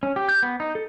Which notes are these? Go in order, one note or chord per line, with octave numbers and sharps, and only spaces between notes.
C#4
G4
G6
B3
D#4
A4